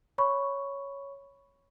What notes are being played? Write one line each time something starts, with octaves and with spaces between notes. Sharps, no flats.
C#5 B5 C#6